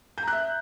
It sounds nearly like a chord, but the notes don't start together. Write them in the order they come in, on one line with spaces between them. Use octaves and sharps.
G6 A#5 F#6 E5